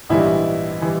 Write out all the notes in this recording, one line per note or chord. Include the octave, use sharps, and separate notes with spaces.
A#1 G#2 E3 G3 E4
E3 G3